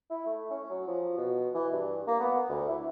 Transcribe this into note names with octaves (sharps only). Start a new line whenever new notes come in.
E4
A3
C#4
F#3
F3
B2
E3
G2
A#3
B3
D2
E4